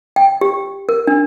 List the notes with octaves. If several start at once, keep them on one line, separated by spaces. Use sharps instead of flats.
G5
G4
A#4
D4